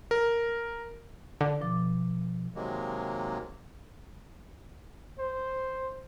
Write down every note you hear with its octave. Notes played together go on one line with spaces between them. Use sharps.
A#4
D3
B2 F3 D6
C3 D#3 F#3 G#3 A#3
C5